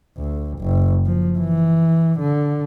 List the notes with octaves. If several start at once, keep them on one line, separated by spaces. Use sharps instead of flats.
D2
F#1
F3
E3
D3